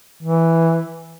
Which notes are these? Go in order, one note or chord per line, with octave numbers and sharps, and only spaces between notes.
E3